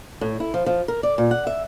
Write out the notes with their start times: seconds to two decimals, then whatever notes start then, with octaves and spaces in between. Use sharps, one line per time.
0.21 A2
0.40 E4
0.54 F3
0.66 F3
0.88 A#4
1.03 D5
1.18 A#2
1.31 F#5
1.47 E5